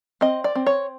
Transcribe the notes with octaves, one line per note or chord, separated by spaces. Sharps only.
C4 D#5
D5
C4
C#5